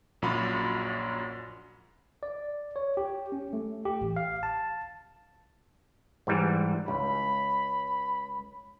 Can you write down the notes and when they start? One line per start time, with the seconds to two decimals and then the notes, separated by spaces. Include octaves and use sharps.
0.22 A#1 F#2 F4 F#4 B5
2.23 D5
2.76 C#5
2.97 G4
3.32 C#4
3.53 A3
3.85 G4
4.01 A1
4.16 F5
4.43 A5
6.27 G#2 E3 G3
6.88 C#2 B5